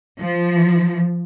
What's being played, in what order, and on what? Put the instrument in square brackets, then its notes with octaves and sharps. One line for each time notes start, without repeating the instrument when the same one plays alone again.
[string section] F3